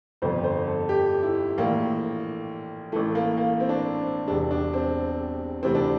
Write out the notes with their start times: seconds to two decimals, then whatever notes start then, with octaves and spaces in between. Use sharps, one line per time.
0.22 G1 F2 D3 C5
0.44 C5
0.67 A4
0.89 G4
1.23 E4
1.58 A#1 A2 E3 A#3
2.92 A1 A2 E3 A3
3.15 A#3
3.37 A#3
3.60 C4
3.69 D4
3.77 C4
4.28 E1 E2 C3 D4
4.51 D4
4.74 C4
5.63 D2 C3 E3 C4
5.75 D4